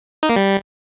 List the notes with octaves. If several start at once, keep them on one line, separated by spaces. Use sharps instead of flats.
D#4
A#3
G3